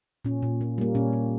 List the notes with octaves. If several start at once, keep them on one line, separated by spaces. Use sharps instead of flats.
A#2 C#4
A#2
A#3
G3 A#3
A#2 C#4
A#2